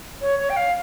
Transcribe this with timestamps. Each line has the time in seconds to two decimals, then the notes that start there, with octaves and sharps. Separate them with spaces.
0.21 C#5
0.39 C#5
0.50 G5
0.56 F5